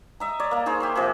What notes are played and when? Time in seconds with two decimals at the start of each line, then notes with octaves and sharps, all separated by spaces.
0.20 D#5 E5 A#5
0.40 C#5 D5
0.51 A#3 D#5
0.66 D#4 G#4 C5 C#5
0.80 G4 E5 C6
0.95 C3 F3 G#4